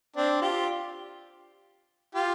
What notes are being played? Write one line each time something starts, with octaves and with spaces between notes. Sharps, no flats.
C4 D4
F4 G4
F4 G4